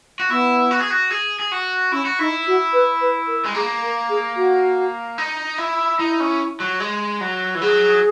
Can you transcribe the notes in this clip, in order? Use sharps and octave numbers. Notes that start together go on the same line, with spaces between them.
F#4
B3 E4
F#4
G#4
F#4
G#4
G#4
F#4
C#4 E4
F#4
D#4 E4
F#4
B4
B4
A#4
G#3
A#3 G#4
A#4
G#4
F#4
D#4
E4
D#4 E4
C#4
F#3
G#3
F#3
E3
F#3 G#4